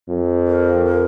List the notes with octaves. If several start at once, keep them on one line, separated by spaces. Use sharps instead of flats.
F2
A#4
A#4